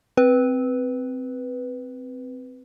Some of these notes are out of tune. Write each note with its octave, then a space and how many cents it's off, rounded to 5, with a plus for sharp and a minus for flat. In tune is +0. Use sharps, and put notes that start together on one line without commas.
C4 -10 B4 +0